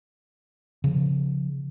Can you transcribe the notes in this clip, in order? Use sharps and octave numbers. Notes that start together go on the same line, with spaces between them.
C#3 F3